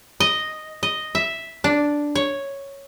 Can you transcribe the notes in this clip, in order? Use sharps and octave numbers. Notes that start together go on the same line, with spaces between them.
D#5
D#5
E5
D4
C#5